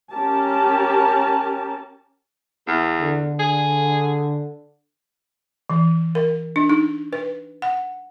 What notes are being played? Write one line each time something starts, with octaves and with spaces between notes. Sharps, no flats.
C#4 G4 A#4 A5
E2
D3
G#4
E3
A#4
D4
D#4
B4
F#5